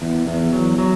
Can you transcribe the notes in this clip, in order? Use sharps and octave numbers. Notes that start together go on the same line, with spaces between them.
E2
E2
F#3
F#3